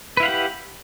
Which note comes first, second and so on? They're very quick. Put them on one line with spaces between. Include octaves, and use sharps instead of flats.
B4 E4 F5 F#5 G4